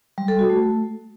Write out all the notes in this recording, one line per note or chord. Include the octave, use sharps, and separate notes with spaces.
G3
A4
F#4
A3